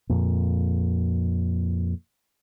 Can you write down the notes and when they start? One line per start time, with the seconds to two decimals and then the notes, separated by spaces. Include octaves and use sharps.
0.09 F2 A#2